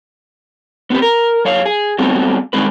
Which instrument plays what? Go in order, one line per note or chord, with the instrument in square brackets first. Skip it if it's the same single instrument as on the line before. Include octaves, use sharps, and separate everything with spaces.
[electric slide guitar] B3 C4 G4 B4
A#4
F#2 C#5 F5
G#4
F#3 G3 A3 B3 C4 F#4
G2 D#3 F3 G#3 C4 B4